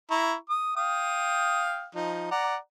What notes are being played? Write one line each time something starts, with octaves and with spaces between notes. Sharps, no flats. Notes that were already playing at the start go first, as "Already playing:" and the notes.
E4 A#5 C#6
D#6
F5 G5 D#6
F3 D#4
D5 F#5 A#5